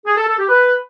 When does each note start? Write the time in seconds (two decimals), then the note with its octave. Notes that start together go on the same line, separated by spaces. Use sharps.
0.05 G#4
0.16 A4
0.27 A4
0.38 G4
0.49 B4